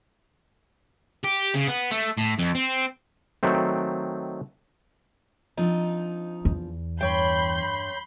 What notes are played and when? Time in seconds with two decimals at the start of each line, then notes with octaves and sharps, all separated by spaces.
1.24 G4
1.54 C#3
1.67 B3
1.91 A3
2.17 A2
2.39 F2
2.55 C4
3.43 D#3 F#3 A3 C4
5.58 F3 C4 D4 D#4
6.45 E2
7.01 G2 C#5 G5 B5 C6 G6